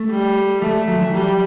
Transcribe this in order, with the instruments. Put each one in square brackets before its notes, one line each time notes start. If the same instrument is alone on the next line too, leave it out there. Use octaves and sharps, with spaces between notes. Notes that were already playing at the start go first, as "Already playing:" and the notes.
Already playing: [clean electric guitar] A3
[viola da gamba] G3
[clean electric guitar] G3 [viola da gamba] A3
[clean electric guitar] F#3
E3
[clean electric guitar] F#3 [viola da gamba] G3